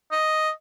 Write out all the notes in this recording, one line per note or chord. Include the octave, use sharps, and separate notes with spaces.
D#5